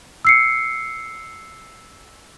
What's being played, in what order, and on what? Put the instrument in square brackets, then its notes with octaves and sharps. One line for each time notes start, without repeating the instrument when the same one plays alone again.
[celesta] E6 C7 C#7